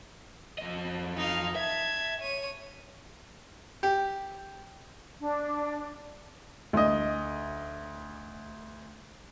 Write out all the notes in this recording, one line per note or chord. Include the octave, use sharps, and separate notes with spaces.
F2 D#5
D#4 F5
E5 A5 G#6
C#5 D#7
G4
D4
D2 D#5